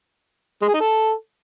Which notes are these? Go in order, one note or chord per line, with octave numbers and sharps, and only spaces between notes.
G#3
G#4
D#4
A4